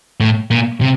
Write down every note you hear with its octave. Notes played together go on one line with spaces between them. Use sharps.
A2
A#2
C3